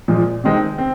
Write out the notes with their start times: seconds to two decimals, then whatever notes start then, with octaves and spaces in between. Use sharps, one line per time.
0.08 A#2 F3 G#3
0.44 C3 D#3 G#3 C4
0.78 C4